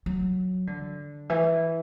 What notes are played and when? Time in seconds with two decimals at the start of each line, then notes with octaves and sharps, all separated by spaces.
0.06 F#3
0.67 D3
1.30 E3